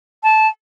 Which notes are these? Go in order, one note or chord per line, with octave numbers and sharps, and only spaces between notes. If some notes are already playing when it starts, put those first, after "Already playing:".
A5